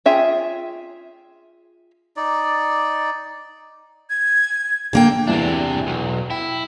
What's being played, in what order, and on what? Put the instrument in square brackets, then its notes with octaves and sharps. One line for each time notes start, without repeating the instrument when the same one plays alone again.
[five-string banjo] F4 G#4 E5 G5
[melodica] D#4 D5
[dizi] G#6
[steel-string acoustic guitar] D3 A#3 G5
[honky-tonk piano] E2 E4 [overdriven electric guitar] C3 D4
[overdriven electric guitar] B1
[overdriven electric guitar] E4 [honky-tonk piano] G5